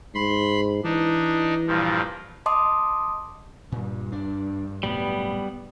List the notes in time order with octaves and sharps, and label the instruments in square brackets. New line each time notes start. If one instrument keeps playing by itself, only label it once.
[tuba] G#2 [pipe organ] B5 C6
[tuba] E3 [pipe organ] D4 D#4
[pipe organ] G2 A#2 F3
[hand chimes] D#5 A5 C6 D6 D#6
[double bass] G2 [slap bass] A#2
[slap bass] D4
[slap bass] C2 A2 F#3 [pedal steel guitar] G3 B3